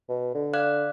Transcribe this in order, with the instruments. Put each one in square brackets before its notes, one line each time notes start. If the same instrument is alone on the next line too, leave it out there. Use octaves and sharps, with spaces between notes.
[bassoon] B2
D3
[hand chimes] D5 F5 F#6